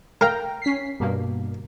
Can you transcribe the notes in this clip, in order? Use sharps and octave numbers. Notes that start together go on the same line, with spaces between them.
A#4 F5 G5 A#5
C#4 B6 C7
G2 B2 A#3